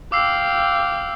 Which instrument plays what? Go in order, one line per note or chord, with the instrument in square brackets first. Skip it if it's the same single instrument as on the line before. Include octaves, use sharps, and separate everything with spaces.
[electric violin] F5 G5 [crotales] D6 E6 C7